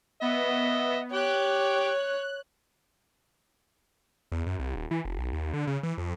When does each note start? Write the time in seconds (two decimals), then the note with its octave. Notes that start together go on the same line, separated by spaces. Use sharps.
0.21 B3 D#5 E5
1.13 G4 C#5 G5 F#6
4.32 E2
4.46 F#2
4.59 C2
4.75 D#1
4.91 E3
5.05 F1
5.18 B1
5.33 D#2
5.53 D3
5.67 C#3
5.83 E3
5.98 F2